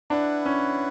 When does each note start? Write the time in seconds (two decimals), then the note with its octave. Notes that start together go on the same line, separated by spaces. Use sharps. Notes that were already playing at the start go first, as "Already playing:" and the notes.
0.10 D4 E4 B4 F#5
0.46 C#4